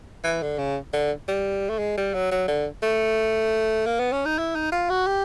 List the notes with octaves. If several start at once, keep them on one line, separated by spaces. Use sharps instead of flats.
E3
D3
C#3
D3
G3
A3
G#3
G3
F#3
F#3
D3
A3
A#3
B3
C#4
D#4
E4
D#4
F4
F#4
G4